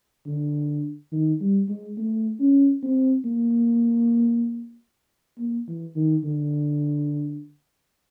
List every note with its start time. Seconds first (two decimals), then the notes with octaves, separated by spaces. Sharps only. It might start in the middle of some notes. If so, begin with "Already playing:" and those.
0.26 D3
1.12 D#3
1.40 G3
1.69 G#3
1.98 A3
2.40 C#4
2.83 C4
3.25 A#3
5.39 A#3
5.68 E3
5.95 D#3
6.24 D3